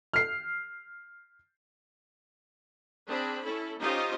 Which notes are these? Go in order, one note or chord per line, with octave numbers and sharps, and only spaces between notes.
F6 C7
C4 D4 G#4 B5
C#4 E4 A4
C#4 D#4 F4 G4 C5 D#5